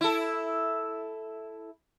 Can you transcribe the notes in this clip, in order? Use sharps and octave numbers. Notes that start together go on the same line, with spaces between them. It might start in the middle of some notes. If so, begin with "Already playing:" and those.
E4 A4